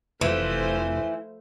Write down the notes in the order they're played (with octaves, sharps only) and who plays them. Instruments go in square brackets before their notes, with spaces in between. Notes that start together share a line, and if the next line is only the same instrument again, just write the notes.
[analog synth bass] F1 [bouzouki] E3 [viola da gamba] F3 A3 C5